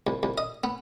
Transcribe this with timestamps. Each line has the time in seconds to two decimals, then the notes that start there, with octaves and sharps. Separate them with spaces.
0.07 C2
0.23 C2
0.38 D#5
0.64 B3